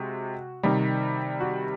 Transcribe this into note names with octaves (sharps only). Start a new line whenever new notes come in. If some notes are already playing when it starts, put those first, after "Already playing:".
Already playing: C3 G#3 F#4
C3 D#3 G3
F#4